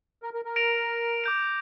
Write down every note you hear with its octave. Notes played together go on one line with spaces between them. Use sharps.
A#4
A#4
A#4
A#6 D7 F7
D6 G6 D7